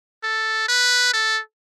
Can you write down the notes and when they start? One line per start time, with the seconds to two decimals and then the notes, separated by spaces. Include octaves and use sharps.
0.23 A4
0.68 B4
1.13 A4